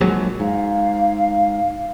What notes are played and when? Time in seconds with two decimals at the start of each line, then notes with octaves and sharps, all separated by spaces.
0.01 A#1 F#3 G#3
0.40 G#2 F5